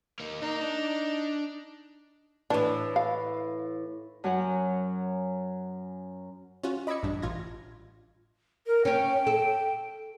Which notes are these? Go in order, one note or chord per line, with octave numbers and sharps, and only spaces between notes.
A#3 D#4
A#3 D#4 A#4
D4 D5
A2 E3 D4
F5
F#2 F#3 C#4 F#5
C#4 F4 F#4
D#5 B5 D6 E6 G#6 C#7
A1 G2 D4
A1 F4 G#6 A#6
A#4
C#4 C#5 G5
A4